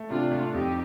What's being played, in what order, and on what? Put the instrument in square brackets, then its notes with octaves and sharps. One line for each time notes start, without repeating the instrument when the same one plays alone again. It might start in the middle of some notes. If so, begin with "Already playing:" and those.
Already playing: [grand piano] A3
[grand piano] C3 [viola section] D4 F4
[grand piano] A3
[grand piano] F2 [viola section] D#4 G4